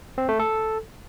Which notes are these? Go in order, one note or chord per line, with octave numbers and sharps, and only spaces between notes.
C4
A3
A4